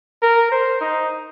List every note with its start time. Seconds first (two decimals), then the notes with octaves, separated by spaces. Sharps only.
0.22 A#4
0.52 C5
0.81 D#4